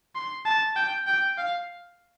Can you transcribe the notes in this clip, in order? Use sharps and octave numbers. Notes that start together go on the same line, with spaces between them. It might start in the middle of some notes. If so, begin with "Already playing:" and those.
C6
A5
G5
G5
F5